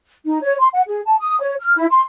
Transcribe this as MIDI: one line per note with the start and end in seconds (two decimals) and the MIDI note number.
0.25 0.38 63
0.42 0.54 73
0.59 0.68 84
0.72 0.81 78
0.86 1.01 68
1.05 1.15 81
1.19 1.37 87
1.40 1.55 73
1.59 1.73 89
1.76 1.85 64
1.91 2.01 84